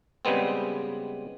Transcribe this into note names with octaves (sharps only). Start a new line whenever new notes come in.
C#3 G3 G#3 B3 C4